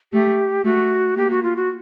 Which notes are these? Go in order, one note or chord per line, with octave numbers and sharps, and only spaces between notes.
A3 G4
A3 F#4
A#3 G4
F#4
F4
F#4